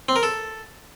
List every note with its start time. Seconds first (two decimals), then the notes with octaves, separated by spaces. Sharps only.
0.09 C4
0.16 A#4
0.23 A4